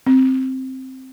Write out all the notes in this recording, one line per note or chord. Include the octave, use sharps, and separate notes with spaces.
C4